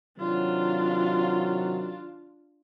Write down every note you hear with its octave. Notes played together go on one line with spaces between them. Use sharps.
C3 D#3 F#3 D4 F4